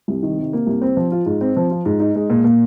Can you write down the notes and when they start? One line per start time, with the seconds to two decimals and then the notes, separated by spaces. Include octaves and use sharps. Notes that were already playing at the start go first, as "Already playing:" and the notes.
0.08 C2
0.23 D#3
0.38 C3
0.53 A#3
0.67 C2
0.82 C4
0.97 F3
1.12 F4
1.26 G#2
1.41 C4
1.57 F3
1.71 F4
1.86 G#2
2.00 D#4
2.16 G#3
2.30 A#2
2.44 A#2